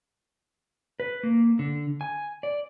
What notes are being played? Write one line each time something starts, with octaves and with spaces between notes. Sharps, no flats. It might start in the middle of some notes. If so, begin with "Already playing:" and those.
B4
A#3
D3
G#5
D5